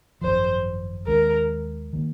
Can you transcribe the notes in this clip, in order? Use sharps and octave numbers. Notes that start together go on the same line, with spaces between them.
G#1 F#2 F3 C5
D#2 D#3 G#3 C#4 A#4
D#3 A#3